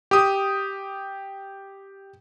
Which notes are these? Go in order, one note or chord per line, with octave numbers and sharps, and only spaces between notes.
G4 D#6